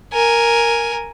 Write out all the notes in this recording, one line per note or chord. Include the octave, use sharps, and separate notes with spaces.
A#4 G#5